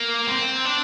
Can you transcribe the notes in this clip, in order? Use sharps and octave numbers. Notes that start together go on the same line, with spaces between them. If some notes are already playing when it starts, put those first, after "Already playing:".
Already playing: A#3
C4
D4